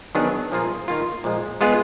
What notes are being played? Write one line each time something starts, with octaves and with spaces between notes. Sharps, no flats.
D#3 F#3 B3 D4 G#4
A#2 F3 A#3 F4 G#4
D#3 A#3 F4
A#2 F3 G#3
G#3 B3 F4 G#4